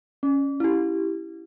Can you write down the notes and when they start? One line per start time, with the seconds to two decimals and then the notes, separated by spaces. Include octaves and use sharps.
0.23 C#4
0.60 E4 G4